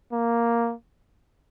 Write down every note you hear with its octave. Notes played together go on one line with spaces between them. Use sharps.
A#3